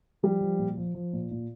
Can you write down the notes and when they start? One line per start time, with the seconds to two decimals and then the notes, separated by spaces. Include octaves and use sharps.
0.23 F3 G3
0.41 F3
0.59 A#2
0.77 F3
0.94 F3
1.13 A#2
1.31 A#2